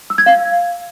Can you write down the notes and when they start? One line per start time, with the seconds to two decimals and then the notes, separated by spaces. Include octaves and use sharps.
0.10 E6
0.18 G#6
0.26 F5